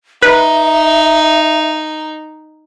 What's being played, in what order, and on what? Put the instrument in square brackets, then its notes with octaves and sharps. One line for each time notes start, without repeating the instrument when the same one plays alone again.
[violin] D#4 [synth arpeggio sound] B4 [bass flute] E5